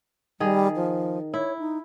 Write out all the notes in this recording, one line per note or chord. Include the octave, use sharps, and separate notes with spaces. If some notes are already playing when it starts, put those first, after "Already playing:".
D#3 G3 G#4
F3
E4 C#5
D#4